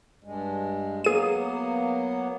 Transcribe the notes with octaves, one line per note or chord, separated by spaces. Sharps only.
G2 G#3
F#3 A#3 B3 G#4 D#7